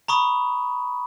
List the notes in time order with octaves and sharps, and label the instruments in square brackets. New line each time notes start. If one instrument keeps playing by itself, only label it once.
[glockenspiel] A#5 B5 C#6 D#6